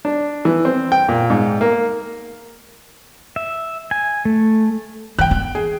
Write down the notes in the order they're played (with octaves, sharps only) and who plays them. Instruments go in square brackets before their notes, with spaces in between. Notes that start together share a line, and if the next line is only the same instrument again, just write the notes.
[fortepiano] D4
E3
C4
G5
A#2
G#2
A#3
[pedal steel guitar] E5
G#5
A3
[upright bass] E3 [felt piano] G5 F#6
[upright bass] B3
[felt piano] G#4